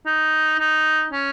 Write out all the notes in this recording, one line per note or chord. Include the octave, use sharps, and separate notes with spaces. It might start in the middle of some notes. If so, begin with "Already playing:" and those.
D#4
D#4
C#4